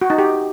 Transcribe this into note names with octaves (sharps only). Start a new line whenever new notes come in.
F#4
D#4
G4